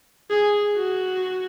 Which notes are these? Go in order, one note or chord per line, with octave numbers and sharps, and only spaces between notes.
G#4
F#4